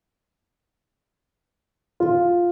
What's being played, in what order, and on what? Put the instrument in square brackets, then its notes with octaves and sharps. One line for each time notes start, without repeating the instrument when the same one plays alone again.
[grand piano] F4